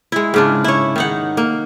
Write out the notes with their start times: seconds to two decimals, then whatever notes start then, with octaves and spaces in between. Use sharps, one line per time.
0.12 G#3 E4
0.34 G#2 C#3 D4
0.64 E4 C#5
0.96 D#3 D#4 F#5
1.37 A#3